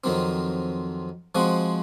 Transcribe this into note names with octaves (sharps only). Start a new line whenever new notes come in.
F2 D#3 F#3 C4
F3 G#3 C4 F#4